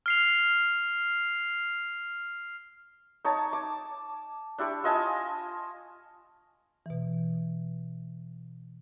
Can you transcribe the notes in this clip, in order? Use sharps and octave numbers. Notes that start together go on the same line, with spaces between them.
F6 C7 F7
D#4 C#5 A5
D6
D4 E4 G4 C#6
F4 D#5 G#5 A5
B2 E3